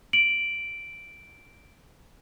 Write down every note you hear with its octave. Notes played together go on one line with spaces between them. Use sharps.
D7 F#7